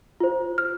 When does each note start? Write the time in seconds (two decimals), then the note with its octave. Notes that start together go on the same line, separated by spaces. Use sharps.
0.20 F4 C5
0.58 F6